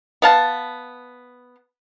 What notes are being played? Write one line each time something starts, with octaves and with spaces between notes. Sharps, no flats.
B3 F5 A5